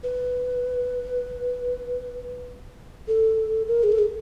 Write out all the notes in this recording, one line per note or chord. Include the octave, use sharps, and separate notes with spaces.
B4
A4
A#4
G#4
A4
G#4